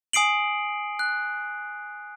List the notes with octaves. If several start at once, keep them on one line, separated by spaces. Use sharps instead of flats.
G#5 D#6 C7 D7 F#7
F#6